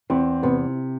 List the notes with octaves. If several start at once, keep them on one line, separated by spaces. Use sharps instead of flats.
E2 C4
C3 B3